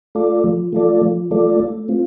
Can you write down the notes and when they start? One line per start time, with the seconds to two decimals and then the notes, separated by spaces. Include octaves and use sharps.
0.15 A3 F4 A4 D5
0.44 F3
0.73 A3 F4 A4 D5
1.02 F3
1.31 A3 F4 A4 D5
1.60 A3
1.88 C4 F4